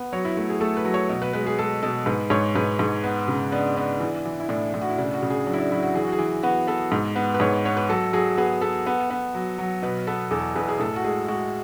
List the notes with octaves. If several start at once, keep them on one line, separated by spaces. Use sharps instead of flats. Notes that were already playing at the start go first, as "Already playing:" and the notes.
Already playing: B3
F#3 C#5
E4
A3 E4
G#4
A3 A4
B4
F#3
C#5
B2
B4
G#3 B4
G#4
G#3 A4
B2 A4
G#2 B4
G#2 C#5
G#2 B4
G#2
B3
C#3
B3 D4
B3 D4
E3
E3
E4
A2 D4
A2
F#4
E4
C#3 D4
F#4
C#3
G#4
F#3 D4
E4
D4
F#3 E4
F#4
E3 G#4
F#4
G#4
E3
B3 F#4
B3 A4
G#2
B3
B4
G#2 C#5
B4
B3 C#5
B4
F#3 A4
F#3 G#4
B3 G#4
B3 A4
B3
B3
F#3
F#3
B2 B4
B3 A4
E2 A4
E2 B4
G#4
A2 A4
F#4
G#3 G#4
G#3 F#4